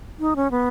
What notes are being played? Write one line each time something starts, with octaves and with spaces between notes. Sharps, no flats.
D#4
C#4
B3